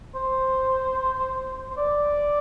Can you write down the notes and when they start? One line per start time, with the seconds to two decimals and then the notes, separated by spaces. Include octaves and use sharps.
0.15 C5
1.70 C5
1.77 D5